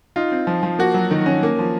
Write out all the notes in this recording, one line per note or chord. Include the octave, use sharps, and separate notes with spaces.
D#4 F4
C4
F3
F3
A#3 F#4
F#3
D#3
C#4
A#3
F3